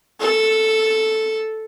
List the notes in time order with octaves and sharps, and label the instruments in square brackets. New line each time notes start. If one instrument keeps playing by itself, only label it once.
[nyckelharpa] A4